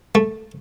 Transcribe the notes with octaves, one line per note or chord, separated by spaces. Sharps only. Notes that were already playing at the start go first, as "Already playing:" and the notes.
A3